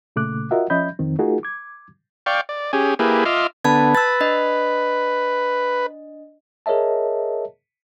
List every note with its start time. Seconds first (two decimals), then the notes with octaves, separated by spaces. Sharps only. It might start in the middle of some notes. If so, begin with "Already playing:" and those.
0.16 A#2 C#3 A3 D6 F#6
0.51 F4 F#4 A#4 D#5 E5 F#5
0.70 F3 C#4 D#5 E5 B5 G6
0.99 F2 D#3 C4
1.19 A3 D#4 F4 F#4 G#4 A#4
1.43 D6 G#6
2.26 D5 F5 G5 C#6
2.49 D5
2.73 C#4 G4 G#4
2.99 A#3 E4 G4 G#4 B4
3.25 F4 D#5 E5 C6 D6 F6
3.65 D3 B3 A5 B5 G#6
3.95 B4 E6 A6
4.21 D4 D#5
6.66 G#4 A#4 C#5 D#5 E5 A5